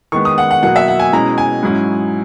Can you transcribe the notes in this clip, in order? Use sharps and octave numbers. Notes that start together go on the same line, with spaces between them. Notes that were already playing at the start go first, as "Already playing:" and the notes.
D#3 G#3 B3 C#6
D#6
F#5
F#5
B2 F#3 A#3 F#5
E5
F#5
G#5
B2 G#3 C#4 E4 A#5
G#5
G#2 F#3 C#4 E4